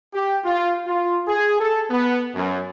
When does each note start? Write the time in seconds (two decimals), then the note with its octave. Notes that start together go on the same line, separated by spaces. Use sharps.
0.14 G4
0.45 F4
0.86 F4
1.28 G#4
1.60 A4
1.91 B3
2.35 F#2